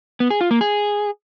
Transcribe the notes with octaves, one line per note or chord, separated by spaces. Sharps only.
B3
G#4
F4
A#3
G#4